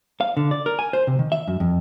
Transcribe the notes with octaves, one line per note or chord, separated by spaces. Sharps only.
F5
D3
D5
A#4
G#5
C5
C3
D#3
E5
F#2
F2